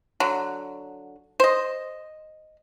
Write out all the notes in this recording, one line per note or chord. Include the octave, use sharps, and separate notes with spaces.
D3 F#3
C5 D#5